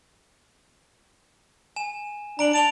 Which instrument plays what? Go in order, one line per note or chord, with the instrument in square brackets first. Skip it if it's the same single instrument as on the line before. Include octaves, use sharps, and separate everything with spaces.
[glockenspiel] G#5 E7
[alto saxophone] D4 [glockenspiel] A#5 D7 F#7
[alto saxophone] A5 [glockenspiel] D7 F7 G7